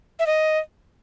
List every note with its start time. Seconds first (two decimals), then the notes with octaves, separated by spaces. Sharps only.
0.19 E5
0.27 D#5